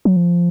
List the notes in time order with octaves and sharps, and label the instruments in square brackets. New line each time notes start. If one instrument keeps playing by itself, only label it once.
[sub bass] F#3
F3